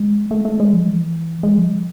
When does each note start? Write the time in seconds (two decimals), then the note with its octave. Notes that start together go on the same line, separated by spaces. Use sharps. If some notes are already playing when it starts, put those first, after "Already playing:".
Already playing: G#3
0.31 A3
0.45 A3
0.60 G#3
0.73 F3
0.88 E3
1.43 G#3
1.58 F3